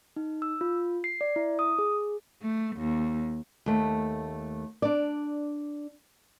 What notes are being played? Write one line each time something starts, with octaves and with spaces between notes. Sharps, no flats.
D#4
E6
F4
C7
D5
E4
D#6
G#4
A3
D#2
D#2 A3
D4 D5